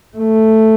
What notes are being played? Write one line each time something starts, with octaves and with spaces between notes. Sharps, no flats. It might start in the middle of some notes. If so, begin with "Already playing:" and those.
A3